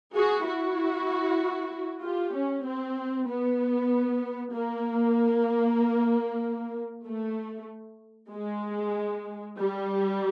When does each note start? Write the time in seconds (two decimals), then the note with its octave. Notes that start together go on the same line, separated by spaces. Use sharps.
0.15 F#4 G#4
0.46 E4 F#4
2.03 F4 G4
2.35 C#4
2.66 C4
3.29 B3
4.54 A#3
7.06 A3
8.32 G#3
9.58 G3